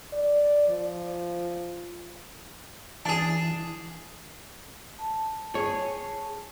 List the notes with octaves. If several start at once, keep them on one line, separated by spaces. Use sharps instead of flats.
D5
F3
E3 D4 G#4 A5
A5
G#4 C#5 G#5